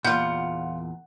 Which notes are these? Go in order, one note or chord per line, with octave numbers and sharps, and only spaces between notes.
E2 A#2 G3 F4 F#5 G6